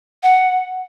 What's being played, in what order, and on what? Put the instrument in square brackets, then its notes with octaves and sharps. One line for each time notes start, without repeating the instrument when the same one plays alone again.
[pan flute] F#5